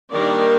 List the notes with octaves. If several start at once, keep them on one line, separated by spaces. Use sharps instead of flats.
D#3 G3 A#3 D4 A#4 D5